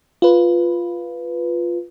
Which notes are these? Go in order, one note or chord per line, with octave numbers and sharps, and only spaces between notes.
F4 B4